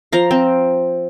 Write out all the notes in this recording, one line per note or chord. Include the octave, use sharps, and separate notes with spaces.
F3 F5 A#5
C4